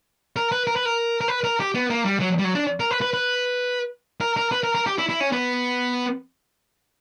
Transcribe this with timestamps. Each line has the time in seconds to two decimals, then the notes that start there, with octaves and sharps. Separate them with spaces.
0.36 A#4
0.52 B4
0.67 A#4
0.76 B4
0.85 A#4
1.21 A#4
1.28 B4
1.44 A#4
1.60 G4
1.75 B3
1.90 A#3
2.05 G3
2.20 F#3
2.39 G3
2.44 F#3
2.55 D4
2.80 A#4
2.91 B4
3.01 B4
3.14 B4
4.21 A#4
4.37 A#4
4.52 B4
4.63 A#4
4.75 A#4
4.86 G4
4.98 E4
5.09 E4
5.20 C#4
5.32 B3